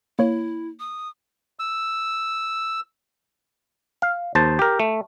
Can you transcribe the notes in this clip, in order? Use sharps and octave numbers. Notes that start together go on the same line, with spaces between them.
A#3 E4 C#5
D#6
E6
F5
D#2 C5 A5
G4 A#4
A3